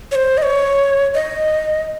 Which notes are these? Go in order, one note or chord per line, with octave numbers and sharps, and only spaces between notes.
C#5
C5
D#5
C#5
D#5